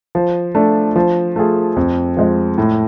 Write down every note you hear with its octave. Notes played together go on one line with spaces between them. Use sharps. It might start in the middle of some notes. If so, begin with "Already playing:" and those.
F3
A3 D4
F3
A3 F4 G#4
F2
F3 G#3
A2